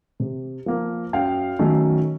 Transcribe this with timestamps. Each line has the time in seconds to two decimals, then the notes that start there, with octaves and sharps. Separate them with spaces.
0.20 C3
0.66 F3 A#3
1.13 F#2 F5 G5
1.59 D#3 F#3 A3 C#4